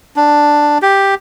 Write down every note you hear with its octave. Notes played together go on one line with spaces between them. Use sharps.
D4
G4